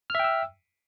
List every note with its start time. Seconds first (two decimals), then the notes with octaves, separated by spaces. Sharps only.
0.10 F6
0.15 E5
0.19 G5
0.24 E6